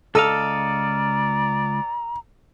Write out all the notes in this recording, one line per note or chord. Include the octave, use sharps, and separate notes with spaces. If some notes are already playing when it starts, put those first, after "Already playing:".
C#2 A4 D5 D#5 F5 A#5 E6